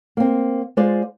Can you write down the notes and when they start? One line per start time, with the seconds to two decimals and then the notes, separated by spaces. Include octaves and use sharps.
0.17 A#3 C4
0.77 G#3 F4 C5 D5